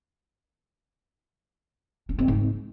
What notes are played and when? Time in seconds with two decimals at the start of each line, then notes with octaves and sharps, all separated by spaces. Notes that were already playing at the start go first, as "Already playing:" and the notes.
2.09 C#4
2.19 C4
2.28 G#2